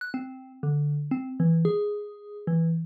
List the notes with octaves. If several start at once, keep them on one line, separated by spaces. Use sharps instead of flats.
F#6
C4
D3
C4
E3
G#4
E3